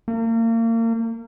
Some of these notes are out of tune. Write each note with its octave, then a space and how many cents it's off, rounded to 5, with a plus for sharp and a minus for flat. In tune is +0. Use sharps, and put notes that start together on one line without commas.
A#3 -35